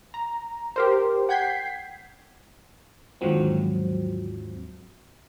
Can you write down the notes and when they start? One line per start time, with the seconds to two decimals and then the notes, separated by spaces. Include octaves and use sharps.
0.14 A#5
0.76 G4 A#4 C5
1.29 F#5 G5 G6 G#6 B6 C7
3.21 D#2 G#2 D3 F3 F#3 C4